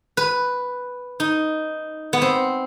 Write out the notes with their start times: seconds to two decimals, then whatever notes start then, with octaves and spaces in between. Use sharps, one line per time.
0.17 B4
1.20 D#4
2.13 B3
2.22 C4